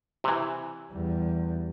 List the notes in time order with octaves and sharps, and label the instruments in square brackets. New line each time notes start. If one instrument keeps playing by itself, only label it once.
[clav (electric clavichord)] C3 E3
[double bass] E2 G3